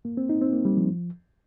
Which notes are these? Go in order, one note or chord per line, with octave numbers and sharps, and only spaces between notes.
A#3
C4
D#4
C4
A#3
G3
F3